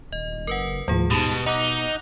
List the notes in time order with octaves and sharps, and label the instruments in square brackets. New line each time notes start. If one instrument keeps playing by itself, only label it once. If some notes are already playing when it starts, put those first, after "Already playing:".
[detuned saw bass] D#1 [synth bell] D#5
[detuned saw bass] F#1 [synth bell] A#4 B4 F#5
[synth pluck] D#2 A2 [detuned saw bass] F3 [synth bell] G3 G#4
[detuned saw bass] G#2 [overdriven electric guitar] B2 [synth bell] G4 A5
[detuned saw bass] B2 [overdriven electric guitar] D#4 [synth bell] F#5 D6 F#6